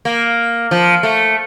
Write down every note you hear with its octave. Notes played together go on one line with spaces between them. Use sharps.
A#3
F3
A3